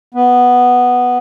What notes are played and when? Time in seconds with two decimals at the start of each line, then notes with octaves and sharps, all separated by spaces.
0.14 B3